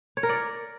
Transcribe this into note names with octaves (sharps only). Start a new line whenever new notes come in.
C#5
A#4
D5